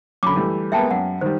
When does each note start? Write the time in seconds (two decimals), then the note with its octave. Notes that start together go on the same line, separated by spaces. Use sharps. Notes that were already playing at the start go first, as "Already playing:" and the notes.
0.23 F#2 D3 B5 D6
0.36 E3 G3 A3
0.72 G#3 A#3 B3 E5 G5 A5
0.91 F#2 F#5
1.21 D#3 G3 C5